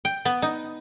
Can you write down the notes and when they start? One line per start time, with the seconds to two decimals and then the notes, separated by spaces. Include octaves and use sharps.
0.05 G5
0.25 B3
0.42 D#4